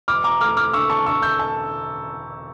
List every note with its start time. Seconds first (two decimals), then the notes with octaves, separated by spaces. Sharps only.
0.08 E1 D6 F6
0.24 A#5 D6
0.41 A3 D6 F6
0.57 D6 F6
0.73 D3 C#6 E6
0.90 A5 C#6
1.06 D3 C#6 E6
1.22 E6 G6
1.39 A5